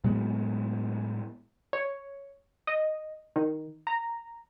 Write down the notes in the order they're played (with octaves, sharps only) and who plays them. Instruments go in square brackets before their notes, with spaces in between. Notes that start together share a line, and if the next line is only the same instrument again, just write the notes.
[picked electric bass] A2 F#3 G#3 B3
[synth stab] C#5
D#5
D#3
A#5